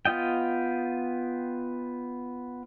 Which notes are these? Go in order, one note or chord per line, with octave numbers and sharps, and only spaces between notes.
B3 F4 D#5 G5